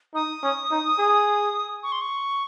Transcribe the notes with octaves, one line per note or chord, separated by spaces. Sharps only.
D#4 D#6
C#4
D#4
G#4
C#6
C6
C#6